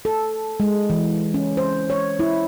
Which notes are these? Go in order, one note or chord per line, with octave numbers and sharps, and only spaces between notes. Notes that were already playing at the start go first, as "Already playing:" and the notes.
A4
G#3
E3
C#4
C5
C#5
E4